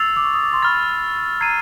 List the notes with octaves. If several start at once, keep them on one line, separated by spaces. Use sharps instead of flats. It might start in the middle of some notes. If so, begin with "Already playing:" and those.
Already playing: C#6 E6 A6 C7 F7
D6
C#6
D#6
D6
C6
B5 C#6 F6 A6
A#5 G#6 C7 D#7